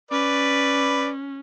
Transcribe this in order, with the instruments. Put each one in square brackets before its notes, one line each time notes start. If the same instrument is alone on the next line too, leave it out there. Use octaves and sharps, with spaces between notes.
[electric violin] C#4 [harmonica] B4 D5